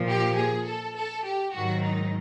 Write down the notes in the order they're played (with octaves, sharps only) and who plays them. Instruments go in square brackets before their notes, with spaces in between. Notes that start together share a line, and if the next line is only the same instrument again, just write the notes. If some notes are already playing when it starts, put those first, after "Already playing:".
Already playing: [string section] A#2 F3
G4
G#4
A4
A4
G4
G#2 D#3 F#3 F#4
D#4